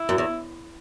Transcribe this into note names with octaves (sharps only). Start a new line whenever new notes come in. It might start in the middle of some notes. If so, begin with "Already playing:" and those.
Already playing: E4
F#2
E2